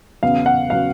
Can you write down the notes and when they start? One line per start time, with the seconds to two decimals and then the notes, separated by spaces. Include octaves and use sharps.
0.22 E2 C#3 F#3 B3 F5
0.46 F#5
0.70 C#3 F#3 B3 F5